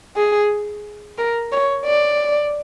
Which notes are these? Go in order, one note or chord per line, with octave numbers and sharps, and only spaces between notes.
G#4
A#4
C#5
D5